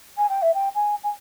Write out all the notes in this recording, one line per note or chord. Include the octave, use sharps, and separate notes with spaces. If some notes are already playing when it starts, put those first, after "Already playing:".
G#5
G5
E5
G5
G#5
G#5